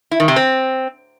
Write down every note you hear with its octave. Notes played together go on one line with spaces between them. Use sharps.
E4
D#3
C3
C4